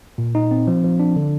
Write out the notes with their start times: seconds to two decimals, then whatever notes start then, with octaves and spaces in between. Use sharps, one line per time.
0.18 A#2
0.35 D#4
0.51 C4
0.67 F3
0.84 F3
0.99 D4
1.16 D3